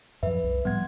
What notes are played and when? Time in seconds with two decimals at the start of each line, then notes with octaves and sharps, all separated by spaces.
0.23 F#2 F3 B4 E5
0.44 C2
0.65 A2 F3 G3 B3 F#5 G#6